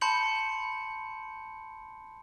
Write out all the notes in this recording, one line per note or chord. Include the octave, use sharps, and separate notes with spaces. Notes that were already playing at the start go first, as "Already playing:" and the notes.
A5 B5 C6 G6 C#7 F#7